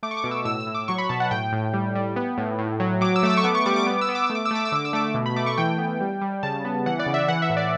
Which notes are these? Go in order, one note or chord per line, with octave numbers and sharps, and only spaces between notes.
A3 D6
C#6
D6
B2
E6
A2 E6
E6
A2
D6
F#3 C#6
B5
B2 A5
F#5
A2 G5
A2
G3
G3
B3
A2
A2
F#3
F#3 D6
E6
A3 D6
E6
C#6
B3 D6
C#6
G3 D6
D6
B3 D6
E6
B3
D6
A3 E6
D6
E6
A3 D6
E6
D3 D6
E6
A3 D6
B2
B5
A3 D6
C#6
E3 G5
B3
G3
G3
C#3 A5
B3
E3 F#5
D5
C#3
E5
E3 F#5
E5
A2
D5